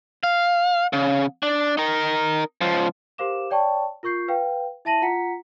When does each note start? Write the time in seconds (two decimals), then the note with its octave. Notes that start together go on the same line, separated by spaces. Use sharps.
0.24 F5
0.93 C#3
1.43 D4
1.77 D#4 A#4
2.61 C#2 F3
3.18 G4 A#4 C5 F5 D6 E7
3.50 C#5 D5 G5 A5 C#6
4.03 F4 A#4 C#6 G6 C7
4.28 B4 F5 G5
4.85 E4 E5 A5 A#6 D#7 F#7
5.02 F4 F#5 A#5 B6 C#7